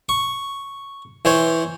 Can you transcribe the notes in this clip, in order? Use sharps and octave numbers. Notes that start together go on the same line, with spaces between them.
C#6
E3 C5 C#5